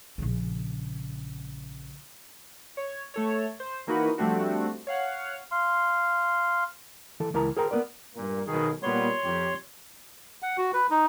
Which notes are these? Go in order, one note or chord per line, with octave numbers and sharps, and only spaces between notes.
A#1 C#3
C#5
A3 A4 C#5
C5
E3 A#3 D#4 F#4 B4
F3 G3 A3 C4 D4 F#4
C#5 F5 F#5
F5 C6
E3 A4
C#2 E3 A#4 A5 A#5
G#4 A#4 C5 G5 A#5
A#3 B3 A#4 D5
G2 A#2 A#3
B1 B2 D#3 G#4
A#2 G3 B3 C#5 C6
F2 G4
F#5
F#4
B4
D#4